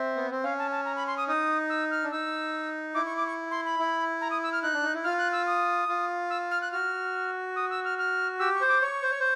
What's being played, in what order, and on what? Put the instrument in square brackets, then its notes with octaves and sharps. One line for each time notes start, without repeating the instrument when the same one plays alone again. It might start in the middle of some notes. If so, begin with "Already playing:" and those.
Already playing: [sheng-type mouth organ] C4 [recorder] E5
[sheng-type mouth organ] B3
C4
[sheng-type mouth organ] C#4 [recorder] F5
[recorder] A5
A5
A#5
B5
C6
D#6
[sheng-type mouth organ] D#4 [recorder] D#6
[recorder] E6
F6
[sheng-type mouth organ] D4
[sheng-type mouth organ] D#4 [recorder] E6
[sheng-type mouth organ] E4 [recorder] D6
[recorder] C#6
D6
C#6
C6
B5
[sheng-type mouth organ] E4
[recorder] A#5
D#6
E6
F6
[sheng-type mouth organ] D#4 [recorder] F#6
[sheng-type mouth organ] D4
D#4
E4
[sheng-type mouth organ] F4 [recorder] F6
[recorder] F#6
E6
D#6
[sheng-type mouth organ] F4
[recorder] E6
F6
F#6
[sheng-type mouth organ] F#4 [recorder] F6
[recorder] D#6
E6
F6
F6
[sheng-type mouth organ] G4 [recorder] E6
[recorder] C#6
[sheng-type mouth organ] C5
[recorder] D6
[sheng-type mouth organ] C#5 [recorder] C#6
[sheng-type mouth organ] C5
C#5
C5